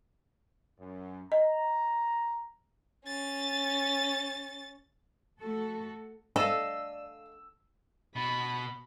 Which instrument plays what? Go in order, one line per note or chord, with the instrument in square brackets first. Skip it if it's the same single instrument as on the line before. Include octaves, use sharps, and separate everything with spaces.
[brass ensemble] F#2
[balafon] D#5 [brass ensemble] A#5
[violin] C#4 A6
[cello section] A3 F#4 A4
[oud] A4 [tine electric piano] D5 [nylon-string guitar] D#5 F5 [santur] E6
[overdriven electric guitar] B2 [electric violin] B5